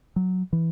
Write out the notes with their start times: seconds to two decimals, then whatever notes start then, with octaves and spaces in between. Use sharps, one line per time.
0.16 F#3
0.53 E3